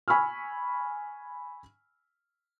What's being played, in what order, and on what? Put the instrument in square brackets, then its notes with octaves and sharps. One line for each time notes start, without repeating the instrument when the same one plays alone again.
[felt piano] G#5 B5 C#6 E6 F6